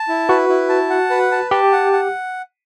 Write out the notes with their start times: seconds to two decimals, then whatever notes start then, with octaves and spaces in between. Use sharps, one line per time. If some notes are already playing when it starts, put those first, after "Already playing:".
Already playing: A5
0.08 E4
0.29 F#4 B4
0.49 E4
0.69 A5
0.90 F#5
1.10 B4
1.32 A5
1.51 G4 A5
1.72 F#5
1.93 F#5